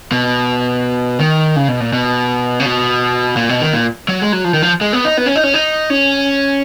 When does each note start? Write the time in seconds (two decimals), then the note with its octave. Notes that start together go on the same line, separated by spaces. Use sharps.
0.12 B2
1.20 D#3
1.56 C#3
1.68 B2
1.80 A#2
1.93 B2
2.60 C#3
2.65 B2
3.36 A#2
3.49 B2
3.61 D#3
3.73 A#2
4.08 F#3
4.21 G#3
4.33 F#3
4.44 F3
4.54 D#3
4.62 F3
4.81 G#3
4.93 B3
5.05 D#4
5.17 B3
5.26 C#4
5.35 D#4
5.44 C#4
5.54 D#4
5.90 C#4